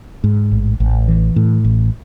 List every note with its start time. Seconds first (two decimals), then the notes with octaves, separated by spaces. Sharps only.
0.24 G#2
0.52 A1
0.80 A1
1.08 E3
1.36 A2
1.65 A1